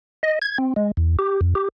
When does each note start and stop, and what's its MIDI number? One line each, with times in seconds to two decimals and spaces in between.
0.23 0.39 75
0.42 0.58 92
0.58 0.74 60
0.76 0.91 56
0.97 1.17 40
1.19 1.41 67
1.41 1.54 41
1.55 1.68 67